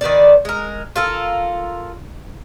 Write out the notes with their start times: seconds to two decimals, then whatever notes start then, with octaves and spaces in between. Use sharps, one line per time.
0.01 D#3 B4 C5 D5
0.45 G#3 A#4
0.96 F4 A4 A#4